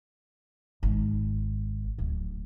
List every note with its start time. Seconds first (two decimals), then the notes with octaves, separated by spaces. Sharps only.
0.83 G#1
1.98 D1